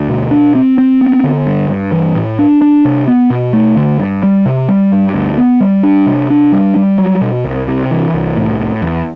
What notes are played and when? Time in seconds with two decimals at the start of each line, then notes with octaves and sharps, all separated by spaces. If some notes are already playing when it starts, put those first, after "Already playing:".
Already playing: D2
0.09 B2
0.31 D4
0.55 C4
0.78 C4
1.01 B3
1.24 D3
1.46 G2
1.69 G2
1.92 E3
2.15 A2
2.39 D4
2.61 D4
2.85 C3
3.08 B3
3.30 B2
3.53 A3
3.76 D3
3.99 G2
4.23 G3
4.46 C3
4.68 G3
4.92 G2
5.14 D2
5.38 B3
5.60 G3
5.83 D4
6.07 C3
6.30 D4
6.52 G3
6.76 G3
6.98 F#3
7.21 B2
7.44 C2
7.68 C3
7.91 E3
8.14 C2
8.37 A2
8.59 A2
8.82 E2